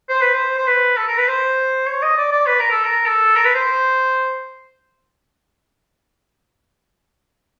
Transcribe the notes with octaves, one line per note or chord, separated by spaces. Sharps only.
C5
B4
C5
C5
B4
A4
A#4
B4
C5
C#5
D#5
D5
D5
B4
A#4
A4
A#4
A4
A#4
B4
C5